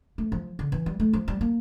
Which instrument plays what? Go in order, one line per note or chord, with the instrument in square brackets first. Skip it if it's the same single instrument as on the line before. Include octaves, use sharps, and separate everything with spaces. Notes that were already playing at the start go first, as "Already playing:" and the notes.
[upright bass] A3
F3
D3
E3
G3
A3
F3
G3
A#3